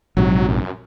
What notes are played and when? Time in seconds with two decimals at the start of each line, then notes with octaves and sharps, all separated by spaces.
0.17 A#1 G#2 C3 F#3
0.48 F#2